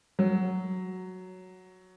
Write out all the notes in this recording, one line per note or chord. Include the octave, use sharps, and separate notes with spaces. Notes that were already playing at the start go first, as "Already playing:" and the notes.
F#3